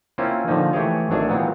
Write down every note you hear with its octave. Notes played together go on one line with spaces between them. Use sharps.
A#3 C4 C#4 E4 F4
A#2 D3 D#3 F3 D#4
E3 A3 G4 G#4 C#5
G#1 F#3 A3 D4 G#4
A#2 E3 F#3 B3 C4